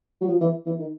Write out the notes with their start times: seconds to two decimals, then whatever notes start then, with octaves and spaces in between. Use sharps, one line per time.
0.21 F#3
0.27 F3
0.41 E3
0.66 E3
0.79 D#3